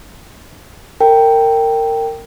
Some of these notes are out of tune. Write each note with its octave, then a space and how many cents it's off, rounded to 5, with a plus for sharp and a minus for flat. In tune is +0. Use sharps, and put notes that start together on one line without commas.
A#4 -25 G5 +0